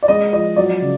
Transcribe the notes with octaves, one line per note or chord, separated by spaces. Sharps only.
D5
G#3 D#5
F3 D#5
F#3 D5
C#3